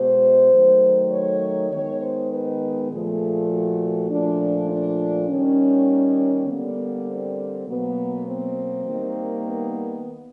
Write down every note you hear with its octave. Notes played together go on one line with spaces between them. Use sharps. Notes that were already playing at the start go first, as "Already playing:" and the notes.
Already playing: B2 G#3 B3 C5
D#3 F#3 A3
C#5
D#3 G#3 B3 C#5
C5
B4
A#2 F3 A3 G#4
F#4
A#2 F3 A3 D4
D4
D#3 G3 A#3 C#4
D3 G3 A#3 B3
C4
B2 F#3 A#3 B3
C4
D#3 G3 A#3
B3